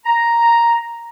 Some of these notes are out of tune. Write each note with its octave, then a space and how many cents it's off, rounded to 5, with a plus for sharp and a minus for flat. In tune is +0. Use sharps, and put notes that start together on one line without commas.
A#5 +0